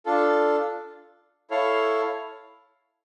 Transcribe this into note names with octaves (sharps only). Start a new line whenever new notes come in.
D4 F4 A4
E4 A4 C#5 F5